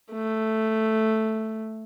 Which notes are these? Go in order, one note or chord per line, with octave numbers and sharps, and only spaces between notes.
A3